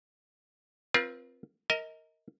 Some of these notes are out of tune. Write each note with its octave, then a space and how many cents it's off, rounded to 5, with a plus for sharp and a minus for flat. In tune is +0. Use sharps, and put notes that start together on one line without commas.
C4 +0 F4 +0 B4 -45
A#4 -15 D#5 +30